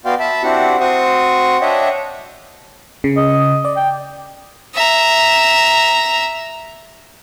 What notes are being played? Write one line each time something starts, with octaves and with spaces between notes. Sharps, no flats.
B3 F#4 D5 F5 G5 C6
E5 A5 B5
C4 D4 E4 F#4 G4 F#5
C4 F#4 C5 C#6 D#6
D4 C#5 D#5 E5 F#5 G5
C#3
D#5
D5
G5
E5 A#5